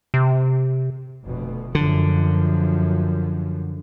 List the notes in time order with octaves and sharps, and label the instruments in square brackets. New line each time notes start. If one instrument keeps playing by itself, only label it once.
[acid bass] C3
[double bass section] F1 D2 B2
[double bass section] F#2 F3 [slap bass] D3